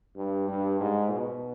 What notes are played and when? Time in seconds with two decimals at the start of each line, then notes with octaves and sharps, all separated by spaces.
0.16 G2
0.48 G2
0.80 G#2
1.11 B2